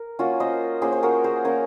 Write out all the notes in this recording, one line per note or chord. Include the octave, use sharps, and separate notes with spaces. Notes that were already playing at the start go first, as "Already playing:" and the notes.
Already playing: A#4
A#3 C#4 F4 F#4
C5 D#5
A#3 C#4 F4 G#4 C5
C5
F#4 A#4
G#4 C5
A#3 C#4 F4 A#4 C#5